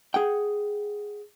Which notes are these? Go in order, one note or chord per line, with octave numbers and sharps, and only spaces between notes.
G#4 F#5 G5